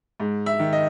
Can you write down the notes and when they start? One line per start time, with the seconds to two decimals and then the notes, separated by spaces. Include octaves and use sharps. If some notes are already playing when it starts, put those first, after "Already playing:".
0.20 G#2
0.46 E5
0.59 D#3
0.73 D#5